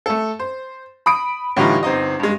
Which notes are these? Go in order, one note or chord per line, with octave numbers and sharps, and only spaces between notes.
A3 A4
C5
B5 D#6 D7
A2 D3 E3 G3 D#4 F4
G1 C4 D#4 D#5
G2 G#3